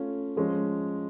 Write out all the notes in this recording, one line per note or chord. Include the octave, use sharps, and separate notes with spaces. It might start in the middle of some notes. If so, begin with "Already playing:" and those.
Already playing: A3 C#4 F4
F3 G#3 C#4